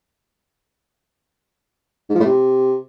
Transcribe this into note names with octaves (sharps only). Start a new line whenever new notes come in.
G#2
F3
A2
C3